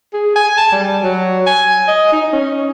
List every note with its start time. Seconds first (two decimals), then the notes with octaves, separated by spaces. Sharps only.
0.13 G#4
0.36 G#5
0.57 A5
0.72 G3
1.03 F#3
1.46 G#5
1.88 D#5
2.12 D#4
2.33 C#4